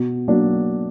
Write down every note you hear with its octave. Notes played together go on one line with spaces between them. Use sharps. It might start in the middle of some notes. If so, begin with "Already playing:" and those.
Already playing: B2
F#3 A#3 D4